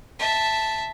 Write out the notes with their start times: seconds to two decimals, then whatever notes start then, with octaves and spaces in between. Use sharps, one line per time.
0.19 E5 A5